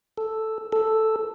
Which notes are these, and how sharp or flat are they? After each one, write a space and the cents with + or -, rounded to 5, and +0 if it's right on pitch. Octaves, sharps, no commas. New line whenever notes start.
A4 +0
A4 +0